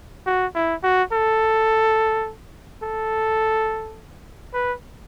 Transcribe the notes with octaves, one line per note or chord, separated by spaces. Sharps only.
F#4
E4
F#4
A4
A4
B4